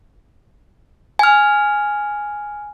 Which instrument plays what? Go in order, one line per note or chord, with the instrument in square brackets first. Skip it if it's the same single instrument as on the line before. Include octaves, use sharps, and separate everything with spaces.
[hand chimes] G#5 F6